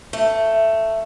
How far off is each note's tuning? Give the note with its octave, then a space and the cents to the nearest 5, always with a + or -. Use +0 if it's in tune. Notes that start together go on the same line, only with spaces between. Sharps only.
A3 +10